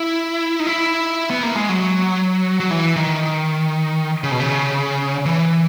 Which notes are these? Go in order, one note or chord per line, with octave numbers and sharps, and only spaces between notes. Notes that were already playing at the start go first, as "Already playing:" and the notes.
Already playing: E4
D#4
E4
B3
A#3
G#3
F#3
F#3
E3
D#3
C#3
B2
C#3
E3